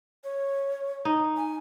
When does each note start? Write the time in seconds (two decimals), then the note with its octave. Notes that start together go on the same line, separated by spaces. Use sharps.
0.24 C#5
1.05 D#4
1.37 G#5